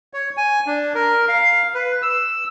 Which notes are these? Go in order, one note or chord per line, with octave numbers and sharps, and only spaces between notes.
C#5
G#5
D4
A#4
F5
B4
E6